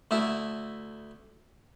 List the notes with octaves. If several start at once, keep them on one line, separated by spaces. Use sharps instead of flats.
D2 A3 E4